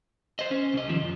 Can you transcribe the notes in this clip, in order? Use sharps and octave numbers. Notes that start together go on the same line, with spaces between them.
C5 D#5
C#4
C2 D#5
D#2 F3
F#2